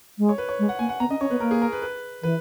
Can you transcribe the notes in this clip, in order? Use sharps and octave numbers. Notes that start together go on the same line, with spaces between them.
G#3
C#5
B4
C#5
G#3
F#5
A#3 G#5
F#5
B3 A#5
C#4 D#5
C#4 C#5
B3 B4
A#3 A#4
G#4
A#4
B4
B4
E3 B4